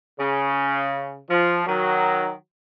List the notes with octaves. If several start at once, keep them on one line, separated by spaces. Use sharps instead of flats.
C#3
F3
D#3 F#3